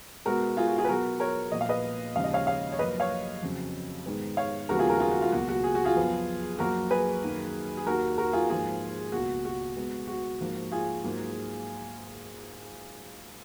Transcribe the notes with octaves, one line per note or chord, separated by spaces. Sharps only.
B2 G#3 B3 F#4 A#4
F4 G#4
F#4
F4 G#4
B4
B2 F#3 B3 F#4 A#4
A#4 C#5
A#2 F3 B3 D#5
F5
B4 D#5
D#2 C#3 F3 G#3 F5
D#5
C#5 F5
C#5 F5
C#5
F#2 F3 A#3 B4 D#5
C#5 F5
F2 C#3 F#3
G#2 D#3 G#3 B3
C#5 F5
D#2 C#3 F3 G#3 B3 F#4 A#4
F4 G#4
F#4 A#4
F4 G#4
F#4
F4
C#2 B2 F#3 A#3 F#4
F#4
G#4
F#4
F4 G#4
F#2 F3 B3
F#2 F3 A#3 F#4 A#4
G#4 B4
F#2 D#3 A#3
G#4
D#2 D#3 A#3 F#4 A#4
F#4 A#4
F4 G#4
G#2 F3 A#3 F4 G#4
C#2 B2 A#3 F#4
F#4
B2 G#3 B3
F#4
G#2 F3 A#3
F4 G#4
G#2 F#3 A#3